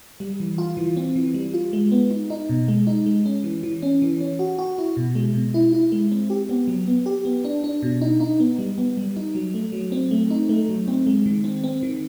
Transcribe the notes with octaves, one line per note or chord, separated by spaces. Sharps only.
G3
E3
F4
E3
C4
E3
G3
F4
G#3
B3
D#4
D#4
B2
G#3
D#4
G#3
C#4
E3
E3
C#4
E3
C#4
F#4
F#4
E4
B2
G#3
B2
E4
E4
G#3
C4
G4
B3
F#3
B3
G4
B3
D4
D4
B2
D#4
D#4
B3
G3
B3
G3
D#4
F#3
A3
F#3
C4
A3
D#4
A3
F#3
C4
G#3
D#3
C4
C4
D#3